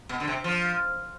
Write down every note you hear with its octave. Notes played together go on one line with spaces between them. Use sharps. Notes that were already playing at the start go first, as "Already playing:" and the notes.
B2
D3
C3
F3